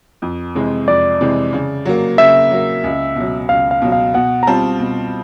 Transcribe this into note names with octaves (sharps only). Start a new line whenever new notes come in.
F2
C3 E3 G#3 C4
F2 D5
C3 E3 G#3 C4
C#3
F#3 A#3
C#3 E5
F#3 A#3
C#2
B2 F#3
C#2 F5
F5
B2 F#3
F5
B2 F#5
A#5
G3 C4 F4 A5
B2